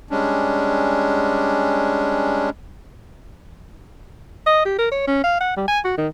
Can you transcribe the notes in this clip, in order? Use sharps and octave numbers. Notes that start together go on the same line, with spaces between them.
G3 G#3 C#4 D4
D#5
G4
A#4
C#5
C#4
F5
F#5
G3
G#5
F#4
D#3